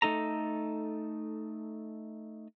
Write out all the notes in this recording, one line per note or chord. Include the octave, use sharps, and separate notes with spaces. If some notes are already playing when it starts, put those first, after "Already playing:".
A3 D#4 A4 A#5